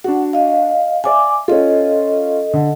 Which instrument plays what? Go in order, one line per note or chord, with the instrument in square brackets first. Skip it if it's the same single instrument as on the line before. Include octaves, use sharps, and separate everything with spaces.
[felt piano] D4 F#4 [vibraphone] F#5
[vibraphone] D#5 F5
[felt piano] D5 E5 F5 [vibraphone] G#5 D6
[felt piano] C#4 F4 [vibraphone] A4 D#5
[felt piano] D3